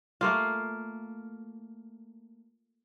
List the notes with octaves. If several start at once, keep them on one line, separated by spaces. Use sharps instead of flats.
A3 A#3 F4